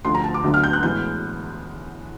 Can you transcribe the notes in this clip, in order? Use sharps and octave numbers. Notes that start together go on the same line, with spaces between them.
D2 D3 F3 C6
A#5
A5
D6
D2 D3 F#3 B3 D4
F6
G6
F#6
A2 E3 G#3 B3 G6